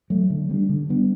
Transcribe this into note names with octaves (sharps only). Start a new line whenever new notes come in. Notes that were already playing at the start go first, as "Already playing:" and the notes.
F#3 A3
D3
G3 B3 D4
D3
G3 B3 D4